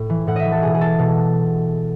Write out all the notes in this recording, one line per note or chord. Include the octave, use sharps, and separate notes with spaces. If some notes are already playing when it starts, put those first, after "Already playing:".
Already playing: A2
E3
A2 F#5
D#5 E5
E3
A4
B2 G#4
G#4
A4
B2